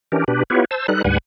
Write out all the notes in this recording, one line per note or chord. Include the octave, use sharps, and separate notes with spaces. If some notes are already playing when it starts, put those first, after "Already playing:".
E3 C#4 D4 G4 A#4
B2 D4 G4 B4
B3 E4 F4 G4 B4 C#5
C5 A5 E6
G3 D#4 A4 B4 F#6
D2 G#2 G3 B4 F#5 G#5